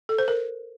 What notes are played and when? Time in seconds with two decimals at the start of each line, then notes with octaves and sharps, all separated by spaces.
0.09 A4
0.18 C5
0.28 A#4